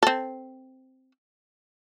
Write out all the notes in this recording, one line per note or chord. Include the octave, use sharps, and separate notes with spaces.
C4 A4